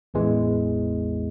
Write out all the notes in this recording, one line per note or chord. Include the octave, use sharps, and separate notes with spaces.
A1 E2 E3 G#3